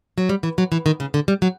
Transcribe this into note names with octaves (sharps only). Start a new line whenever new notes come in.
F#3
G3
E3
F#3
E3
D#3
C#3
D3
G3
F#3